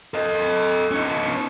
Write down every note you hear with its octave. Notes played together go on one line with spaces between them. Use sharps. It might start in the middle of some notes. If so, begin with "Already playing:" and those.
A4 D#5
C#4 D#4